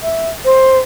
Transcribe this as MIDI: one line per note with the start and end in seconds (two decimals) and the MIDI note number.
0.02 0.29 76
0.45 0.78 72